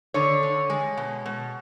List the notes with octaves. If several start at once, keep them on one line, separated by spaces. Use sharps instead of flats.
D3 C#5
D3
G#3
B2
B2